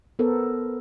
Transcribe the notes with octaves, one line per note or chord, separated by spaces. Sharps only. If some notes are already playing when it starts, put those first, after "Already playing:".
B3 A4 A#4 C5